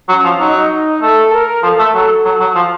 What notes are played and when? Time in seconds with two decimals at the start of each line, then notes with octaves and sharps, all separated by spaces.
0.09 F#3 C#4
0.24 F3
0.39 F#3 D#4
1.01 A3 A4
1.33 A#4
1.63 F3 A4
1.79 A3
1.94 F#3
2.25 F#3
2.40 F#3
2.55 F3